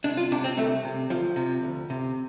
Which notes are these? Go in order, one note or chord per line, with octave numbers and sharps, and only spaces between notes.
C2 D4
F4
C3 D4
C4
C2 A3
C3
D2 F3
C3
D2
C3